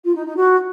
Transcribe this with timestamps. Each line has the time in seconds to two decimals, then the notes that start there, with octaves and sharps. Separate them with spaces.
0.04 F4
0.15 D#4
0.25 D#4
0.36 F#4